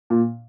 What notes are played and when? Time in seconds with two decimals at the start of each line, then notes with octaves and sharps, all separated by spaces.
0.10 A#2